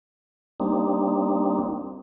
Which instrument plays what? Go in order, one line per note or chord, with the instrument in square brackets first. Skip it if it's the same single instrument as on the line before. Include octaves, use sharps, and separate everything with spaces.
[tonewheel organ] G3 A#3 C4 D4 D#4